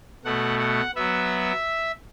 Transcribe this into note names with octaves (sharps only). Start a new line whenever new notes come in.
B2 A3 F#5
F#5
F#3 B3 E5